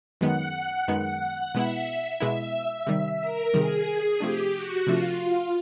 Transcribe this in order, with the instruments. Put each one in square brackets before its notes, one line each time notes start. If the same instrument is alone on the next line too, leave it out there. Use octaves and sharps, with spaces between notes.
[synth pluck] F#2 D#3 G#3 B3 [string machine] F#5
[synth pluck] F#2 D#3 G#3 B3
[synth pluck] B2 G#3 B3 E4 [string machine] E5
[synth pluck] B2 G#3 B3 E4
[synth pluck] C3 D#3 G3 [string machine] E5
[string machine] A#4
[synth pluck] C3 D#3 G3 [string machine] G#4
[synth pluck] C3 F3 A3 D4 [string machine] G4
[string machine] F#4
[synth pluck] C3 F3 A3 D4 [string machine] F4